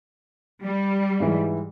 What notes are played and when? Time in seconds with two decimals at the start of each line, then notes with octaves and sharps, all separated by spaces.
0.63 G3
1.20 G#2 E3